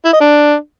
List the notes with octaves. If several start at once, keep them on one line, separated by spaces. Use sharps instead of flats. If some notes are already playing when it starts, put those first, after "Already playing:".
E4
D#5
D4